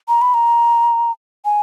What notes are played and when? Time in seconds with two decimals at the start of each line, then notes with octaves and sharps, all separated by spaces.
0.08 A#5
0.22 B5
0.34 A#5
1.45 G#5